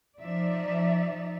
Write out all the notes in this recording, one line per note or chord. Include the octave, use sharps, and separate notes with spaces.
F3 D#4 D5 E5